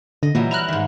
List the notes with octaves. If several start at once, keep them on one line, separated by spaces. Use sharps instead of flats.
D3 D#5
A#2 E3 F#3 G3
E4 A#5 F6 F#6
G#2 D#3